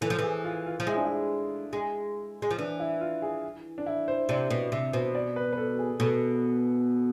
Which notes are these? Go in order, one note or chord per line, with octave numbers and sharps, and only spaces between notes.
E3 A4
F3
E3 G#4
F4
F4
F3
G#3 E4
D4
E4
G#3
G#3
F3
E3 D4
E4
F4
G#4
D4
E4
C5
C3 D5
B2
C3 E5
B2 C5
D5
B4
B4
A4
G#4
B2 A4